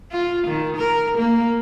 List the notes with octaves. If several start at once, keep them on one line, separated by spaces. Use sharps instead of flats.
F4
D#3
A#4
A#3